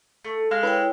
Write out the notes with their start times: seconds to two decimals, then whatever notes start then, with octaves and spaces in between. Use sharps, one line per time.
0.25 A3
0.51 G#3 F5
0.63 E4 B4 C#5 G5